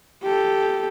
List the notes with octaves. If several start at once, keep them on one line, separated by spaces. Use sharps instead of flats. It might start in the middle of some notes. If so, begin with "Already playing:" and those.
G4 A4